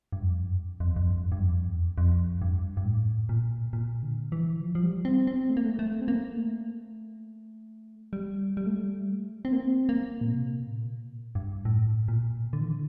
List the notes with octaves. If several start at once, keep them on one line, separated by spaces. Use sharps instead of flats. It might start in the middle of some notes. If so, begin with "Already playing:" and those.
G2
F2
G2
F2
F2
E2
F2
G2
G2
F2
E2
F2
G2
G2
A2
A#2
A#2
D3
E3
F3
F3
G3
C4
C4
A3
A#3
A3
A3
C4
A#3
A3
G3
G3
A3
G3
A3
C4
A#3
C4
A#3
A#2
C3
A2
A#2
G2
A2
A#2
D3
E3
D3